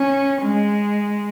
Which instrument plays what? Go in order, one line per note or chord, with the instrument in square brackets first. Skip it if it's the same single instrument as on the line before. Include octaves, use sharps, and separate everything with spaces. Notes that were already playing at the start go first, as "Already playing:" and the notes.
Already playing: [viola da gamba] C#4
G#3